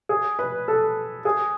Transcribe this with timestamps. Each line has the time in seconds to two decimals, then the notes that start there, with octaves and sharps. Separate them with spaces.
0.09 G#4
0.39 B4
0.68 A4
1.25 G#4